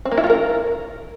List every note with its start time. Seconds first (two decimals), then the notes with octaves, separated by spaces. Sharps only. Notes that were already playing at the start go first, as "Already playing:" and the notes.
0.05 C4
0.11 A#3
0.18 E4
0.24 F4
0.30 A#4